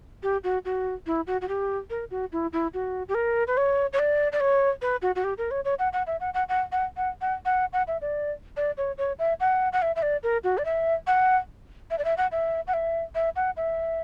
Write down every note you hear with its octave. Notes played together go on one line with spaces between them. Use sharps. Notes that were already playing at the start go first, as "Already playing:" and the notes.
G4
F#4
F#4
E4
F#4
F#4
G4
A#4
F#4
E4
E4
F#4
G4
A#4
B4
C#5
C#5
D5
D5
C#5
B4
F#4
F#4
G4
A#4
C#5
C#5
F#5
F#5
E5
F#5
F#5
F#5
F#5
F#5
F#5
F#5
F#5
E5
D5
D5
C#5
C#5
E5
F#5
F#5
E5
E5
D5
A#4
F#4
D5
E5
F#5
E5
D5
E5
F#5
E5
F#5
E5
E5
F#5
E5